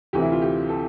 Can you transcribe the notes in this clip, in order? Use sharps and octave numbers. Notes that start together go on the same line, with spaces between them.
D2 C3 E3 G4
E4
F4
G4
A4